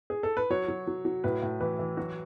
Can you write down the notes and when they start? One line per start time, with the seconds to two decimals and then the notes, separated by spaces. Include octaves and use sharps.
0.10 G#4
0.23 A4
0.37 B4
0.50 F#3 C#5
0.68 F#3
0.87 F#3
1.05 F#3
1.24 A2 B4
1.42 A2
1.60 E3 B4
1.79 E3
1.97 F#3 F#4